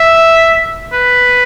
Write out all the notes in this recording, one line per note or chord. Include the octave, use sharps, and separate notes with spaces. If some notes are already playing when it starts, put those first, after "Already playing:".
Already playing: E5
B4